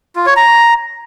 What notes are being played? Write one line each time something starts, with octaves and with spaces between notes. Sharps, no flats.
F4
C#5
A#5